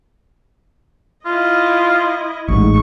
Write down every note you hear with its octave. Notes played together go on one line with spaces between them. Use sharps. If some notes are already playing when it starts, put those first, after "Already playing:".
E4 F4 D#5
A1 G#2 C#6